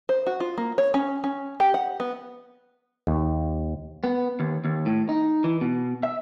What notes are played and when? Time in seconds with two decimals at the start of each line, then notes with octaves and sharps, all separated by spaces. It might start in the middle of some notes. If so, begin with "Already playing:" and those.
0.09 C5
0.26 F#4
0.40 F4
0.58 A#3
0.78 C#5
0.94 C#4
1.24 C#4
1.60 G4
1.74 F#5
2.00 B3
3.07 D#2
4.04 B3
4.40 D#2
4.65 D#2
4.86 A2
5.09 D#4
5.44 E3
5.61 B2
6.03 E5